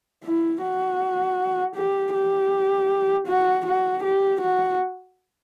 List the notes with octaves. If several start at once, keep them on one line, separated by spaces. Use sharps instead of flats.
E4
F#4
G4
G4
F#4
F#4
G4
F#4